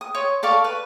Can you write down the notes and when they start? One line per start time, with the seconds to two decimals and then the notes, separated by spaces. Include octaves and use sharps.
0.01 D#6
0.15 C#5 C6
0.43 A4 D5 F5 C#6
0.64 B4